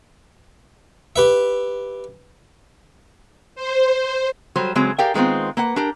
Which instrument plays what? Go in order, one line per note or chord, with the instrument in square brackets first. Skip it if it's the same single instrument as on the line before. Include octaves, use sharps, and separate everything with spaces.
[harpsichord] G4 B4 E5
[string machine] C5
[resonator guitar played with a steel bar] F#3 G3 C5
C#3 F#3 G#3 C4
G4 G#4 A#4 D5 F5 G5
D#3 G#3 B3 C4 F4
A#3 B4 F#5
D4 G4 A#4